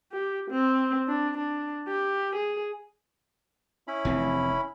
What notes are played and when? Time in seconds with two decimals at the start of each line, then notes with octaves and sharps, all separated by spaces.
0.12 G4
0.51 C4
1.08 D4
1.37 D4
1.87 G4
2.36 G#4
3.88 C#4 E4 B5
4.05 F1 E3 C4